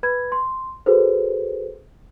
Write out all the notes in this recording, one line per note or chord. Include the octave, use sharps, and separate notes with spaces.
B4 B5 G#6
C6
F#4 G#4 A4 B4 C5